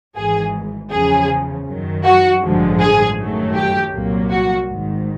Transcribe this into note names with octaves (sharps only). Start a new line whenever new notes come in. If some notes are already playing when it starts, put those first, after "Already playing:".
G#1 G#2 E3 G#4
E2 C#3 F3 G#4
F#2 D#3 F#3
F#4
A1 G2 D3 F3 G#3
G#4
F#2 D#3 F#3 A3
G4
C2 A#2 F#3 A#3
F#4
G#1 G#2 D#3